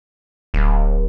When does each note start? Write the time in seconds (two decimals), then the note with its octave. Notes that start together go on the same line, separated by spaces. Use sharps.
0.54 D1